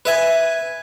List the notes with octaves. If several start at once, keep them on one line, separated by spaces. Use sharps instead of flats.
B4 E5 G#5